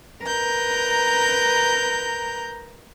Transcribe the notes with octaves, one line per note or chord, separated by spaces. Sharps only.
A#4 B4 A#5 G6